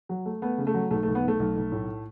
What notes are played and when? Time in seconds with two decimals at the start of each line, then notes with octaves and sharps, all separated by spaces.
0.09 F#3
0.26 A3
0.42 A3 B3
0.58 C#3
0.67 A3
0.74 F#3
0.91 B1 A3
1.03 A3
1.07 B1
1.15 B3
1.23 B1 A3
1.39 B1
1.56 B1
1.72 A2